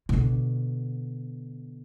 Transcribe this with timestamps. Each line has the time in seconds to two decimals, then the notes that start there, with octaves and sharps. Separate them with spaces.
0.09 B2 D3